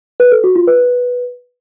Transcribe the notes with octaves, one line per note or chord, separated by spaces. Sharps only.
B4
A4
F#4
F4
B4